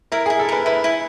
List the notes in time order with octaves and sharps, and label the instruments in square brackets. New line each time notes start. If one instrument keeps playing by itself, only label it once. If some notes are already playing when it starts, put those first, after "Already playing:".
[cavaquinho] E4 [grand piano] A#4
[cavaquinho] E4 [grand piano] G#4
[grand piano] A4
[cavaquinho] A#4 [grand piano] B4
[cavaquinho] E4 [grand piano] B4
[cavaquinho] E4